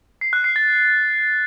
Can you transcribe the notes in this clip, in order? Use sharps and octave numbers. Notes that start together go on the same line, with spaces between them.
C7
F#6
C7
A6